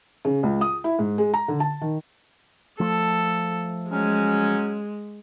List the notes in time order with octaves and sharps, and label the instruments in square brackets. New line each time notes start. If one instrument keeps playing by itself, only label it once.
[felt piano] C#3
C#2
D#6
E4
G#2
G#3
A#5
D3
A5
D#3
[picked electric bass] F3 A3 [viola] A4
[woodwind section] F#3 C#4 [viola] G#3